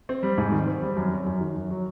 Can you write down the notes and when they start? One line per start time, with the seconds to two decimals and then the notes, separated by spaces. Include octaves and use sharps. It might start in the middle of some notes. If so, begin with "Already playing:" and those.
0.09 C4
0.23 G3
0.38 G#2
0.52 D#3
0.67 C4
0.82 G3
0.96 F#2
1.12 F#3
1.26 F#2
1.41 D#3
1.56 F#2
1.70 F#3